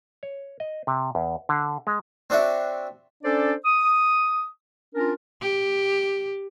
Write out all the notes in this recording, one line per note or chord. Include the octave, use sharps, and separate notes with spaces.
C#5
D#5
C3
E2
D3
G#3
C4 D4 F#4 E5
C#4 D4 A4 C5 D5
D#6
C#4 D4 F4 A#4
G4